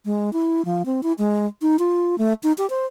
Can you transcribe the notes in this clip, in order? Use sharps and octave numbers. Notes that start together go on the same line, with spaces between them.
G#3
E4
F3
C4
E4
G#3
D#4
F4
A3
D#4
G4
C5